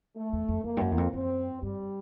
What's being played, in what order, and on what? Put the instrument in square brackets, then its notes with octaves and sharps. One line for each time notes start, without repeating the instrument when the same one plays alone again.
[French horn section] A3
[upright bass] E2
F2
[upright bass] F2 [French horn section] A#3
[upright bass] G2
F#2
E2
F2
[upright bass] F#2 [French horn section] C4
[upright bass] G2 [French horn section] G3